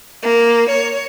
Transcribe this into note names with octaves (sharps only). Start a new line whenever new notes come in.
A#3
C#5